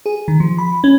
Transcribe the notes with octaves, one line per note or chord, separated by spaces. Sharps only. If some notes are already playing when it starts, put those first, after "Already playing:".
G#4
D#3
F3
B5
C#4